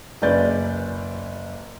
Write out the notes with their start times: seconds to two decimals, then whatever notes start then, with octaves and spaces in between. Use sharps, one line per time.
0.22 F#1 C#4 B4 D5 G6 A6